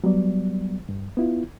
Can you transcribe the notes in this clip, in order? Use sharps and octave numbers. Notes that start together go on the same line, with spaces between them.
F#3 G3 B3 D5
G2
B3 E4 F4